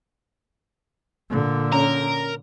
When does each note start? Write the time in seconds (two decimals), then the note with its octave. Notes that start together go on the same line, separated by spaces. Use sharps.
1.30 A#2 D3
1.72 C#4 A#4